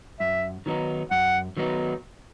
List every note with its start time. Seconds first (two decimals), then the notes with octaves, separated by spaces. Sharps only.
0.20 F#2 E5
0.66 D#3 F#3 B3 D#4
1.11 F#2 F#5
1.57 D#3 F#3 B3 D#4